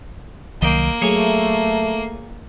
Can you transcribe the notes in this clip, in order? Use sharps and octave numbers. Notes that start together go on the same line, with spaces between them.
C2 D#3 F#3 A#3 D#5 G5
F#3 A3 G#4 C#5 G#5